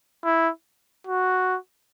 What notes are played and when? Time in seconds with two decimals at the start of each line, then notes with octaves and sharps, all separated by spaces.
0.24 E4
1.07 F#4